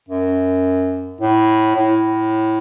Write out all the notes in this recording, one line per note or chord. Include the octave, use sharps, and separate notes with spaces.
F#2
A2
A2